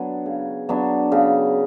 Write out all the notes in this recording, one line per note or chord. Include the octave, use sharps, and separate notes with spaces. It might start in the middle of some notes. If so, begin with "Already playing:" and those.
Already playing: F#3 B3 D4
C#3
F#3 B3 D4
C#3